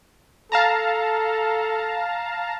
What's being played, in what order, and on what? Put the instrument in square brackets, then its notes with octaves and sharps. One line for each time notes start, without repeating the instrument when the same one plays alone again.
[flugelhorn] A4 [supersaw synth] F5 A5 A#5